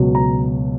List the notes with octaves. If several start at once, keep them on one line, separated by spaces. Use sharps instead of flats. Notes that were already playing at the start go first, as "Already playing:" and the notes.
Already playing: C#2 B2 F#3
A#5